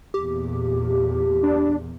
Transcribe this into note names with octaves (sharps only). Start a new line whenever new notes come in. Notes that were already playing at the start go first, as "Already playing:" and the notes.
E2 A#2 G4
D4